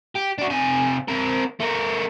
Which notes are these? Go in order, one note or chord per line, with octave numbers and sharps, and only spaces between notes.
G4
D4 F#4
C3 G#5
C4 A#4
A3 A#4